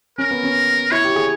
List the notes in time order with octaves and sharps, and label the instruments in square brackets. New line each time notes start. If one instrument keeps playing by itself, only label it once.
[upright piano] C#4 [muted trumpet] A#4
[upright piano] B3
C#4
[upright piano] E4 [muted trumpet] C#5
[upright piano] G4
G#4